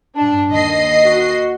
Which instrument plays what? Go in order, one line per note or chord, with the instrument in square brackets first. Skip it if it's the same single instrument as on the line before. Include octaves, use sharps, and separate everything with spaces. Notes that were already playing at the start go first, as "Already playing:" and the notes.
[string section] G2 D4
D#2 D#5 C7
[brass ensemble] F#4